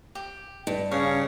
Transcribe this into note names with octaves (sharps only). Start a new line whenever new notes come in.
G4
G2
C#3 C#4 C#5 F5